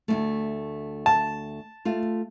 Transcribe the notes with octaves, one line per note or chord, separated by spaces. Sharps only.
D2 G#2 A3
A5
A3 F4